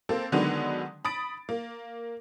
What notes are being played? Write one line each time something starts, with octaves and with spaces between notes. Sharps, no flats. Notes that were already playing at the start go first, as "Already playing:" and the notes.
A#3 C4 A4
D3 D#3 F#3 G#3 B3 D4
B5 D#6 A6 D7
A#3